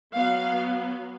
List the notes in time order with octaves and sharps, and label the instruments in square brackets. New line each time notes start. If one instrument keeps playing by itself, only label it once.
[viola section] F#3 B3 F5